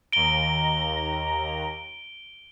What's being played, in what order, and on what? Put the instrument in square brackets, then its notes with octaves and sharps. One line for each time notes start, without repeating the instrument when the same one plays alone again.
[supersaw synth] D#2 A#5 [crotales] D7 G7